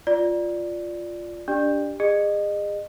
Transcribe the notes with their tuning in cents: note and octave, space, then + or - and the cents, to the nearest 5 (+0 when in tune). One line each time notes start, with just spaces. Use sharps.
F4 +0 D5 +0
D4 -15 G4 +0 D5 +30
G#4 -30 D#5 -30